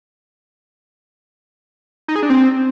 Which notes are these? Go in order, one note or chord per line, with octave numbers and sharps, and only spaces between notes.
D#4
G#4
D4
C4